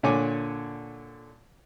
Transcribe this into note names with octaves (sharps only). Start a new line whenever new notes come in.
A#2 D3 C#5 G#5 D6